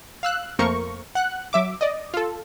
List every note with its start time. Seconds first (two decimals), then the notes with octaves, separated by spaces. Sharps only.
0.23 F5 E6 F#6
0.59 F2 A3 A#3 A#4 C5 C#6
1.15 F#5 F#6
1.53 F#3 E5 D6
1.81 D5 D#5
2.14 F4 A4